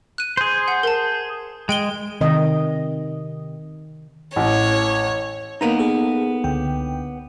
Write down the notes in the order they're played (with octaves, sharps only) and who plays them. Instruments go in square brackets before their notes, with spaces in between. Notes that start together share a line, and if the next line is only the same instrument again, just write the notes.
[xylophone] F#6 D#7
[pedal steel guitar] G#4 C5
[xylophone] F#5
A#4 A5
[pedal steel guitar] G#3 [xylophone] G5 D7 G7
[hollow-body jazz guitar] C3 [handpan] D#3 D#5
[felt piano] A1 A2 [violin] C#5
[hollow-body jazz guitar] A#3 B3 D#4 [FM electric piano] A#5
[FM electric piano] G#4 A4
C#2 D3 G5